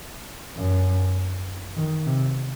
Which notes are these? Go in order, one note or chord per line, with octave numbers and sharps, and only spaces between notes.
F#2
D#3
C3